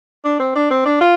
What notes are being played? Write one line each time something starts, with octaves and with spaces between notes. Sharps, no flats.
D4
C4
D4
C4
D4
F4